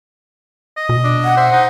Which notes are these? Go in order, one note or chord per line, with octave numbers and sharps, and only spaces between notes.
D#5
B2
D4
F#5
C5 E5
D#4